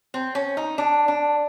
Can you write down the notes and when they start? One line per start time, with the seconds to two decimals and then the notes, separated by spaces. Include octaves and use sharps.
0.14 C4
0.35 C#4
0.57 D#4
0.78 D4
1.08 D4